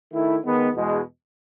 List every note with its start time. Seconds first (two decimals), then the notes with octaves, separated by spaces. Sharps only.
0.12 D#3 A3 E4
0.44 D#3 G#3 B3
0.74 E2 B2 G#3